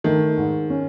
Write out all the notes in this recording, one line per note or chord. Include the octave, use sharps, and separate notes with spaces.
D#3 A3
G#2
C#4